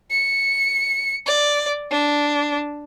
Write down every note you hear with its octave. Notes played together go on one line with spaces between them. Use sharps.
C#7
D5
D4